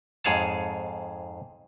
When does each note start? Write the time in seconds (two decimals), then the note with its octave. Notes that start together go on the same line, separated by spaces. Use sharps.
0.24 F2 G#2 G#4 C#5 F5 A5